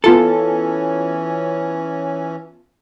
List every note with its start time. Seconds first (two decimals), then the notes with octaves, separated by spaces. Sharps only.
0.04 E3 B3 C#4 F4 A4 A5